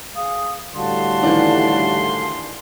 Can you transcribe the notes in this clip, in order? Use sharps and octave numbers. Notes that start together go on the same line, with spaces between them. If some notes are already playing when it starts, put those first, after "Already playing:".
G#4 F5 D#6
A2 D3 G3 F#4 F5 A5 C6
D#3 E3 D4